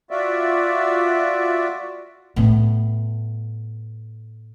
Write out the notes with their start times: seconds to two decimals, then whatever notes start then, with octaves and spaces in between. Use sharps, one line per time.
0.11 F4 F#4 D5 E5
2.36 A2 B3